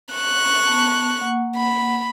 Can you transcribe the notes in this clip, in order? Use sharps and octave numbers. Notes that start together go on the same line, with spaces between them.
C#6 F#6
B3 A5
A#3 F#5
B5